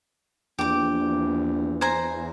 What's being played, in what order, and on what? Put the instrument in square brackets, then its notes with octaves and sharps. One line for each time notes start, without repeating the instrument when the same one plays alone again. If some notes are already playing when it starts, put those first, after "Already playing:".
[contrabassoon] A#1 [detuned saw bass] E2 [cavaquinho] G4 D6
[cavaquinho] C5 G#5 A#5